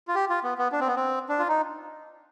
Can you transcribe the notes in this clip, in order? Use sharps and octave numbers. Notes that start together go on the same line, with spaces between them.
F4
G4
F4
B3
B3
D4
C4
B3
C4
D4
F4
D#4